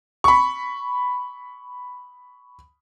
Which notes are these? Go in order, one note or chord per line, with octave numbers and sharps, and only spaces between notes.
B5 C#6